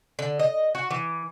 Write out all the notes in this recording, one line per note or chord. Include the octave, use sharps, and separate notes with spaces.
D3
D#5
F#4
E3